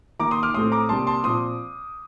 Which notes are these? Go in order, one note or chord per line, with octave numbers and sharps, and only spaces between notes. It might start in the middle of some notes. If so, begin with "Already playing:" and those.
D#3 A#3 A#5 D6
C6 D#6
D6 F6
A2 A3 C4 C6 D#6
A#5 D6
C3 G3 A#3 A5 C6
A5 C6
A#2 F3 C4 C6 D#6